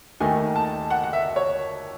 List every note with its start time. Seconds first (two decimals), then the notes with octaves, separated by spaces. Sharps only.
0.20 D#2 D#3 A3 D#4 G#5
0.56 A5
0.90 F#5
1.03 F#5
1.13 E5
1.36 C#5